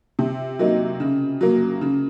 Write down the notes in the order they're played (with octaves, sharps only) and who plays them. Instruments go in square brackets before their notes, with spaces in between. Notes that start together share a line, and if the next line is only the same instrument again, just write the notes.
[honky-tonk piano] C3
F#3 A#3 D#4
C#3
F#3 A#3
C#3